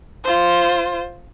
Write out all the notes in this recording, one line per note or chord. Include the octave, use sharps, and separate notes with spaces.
F4 C5